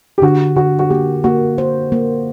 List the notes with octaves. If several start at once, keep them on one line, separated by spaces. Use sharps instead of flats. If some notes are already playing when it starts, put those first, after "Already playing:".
G4
D3 F#4
D3 F#4
F#4
A#3 G4
A#3 F#4
C5
A#3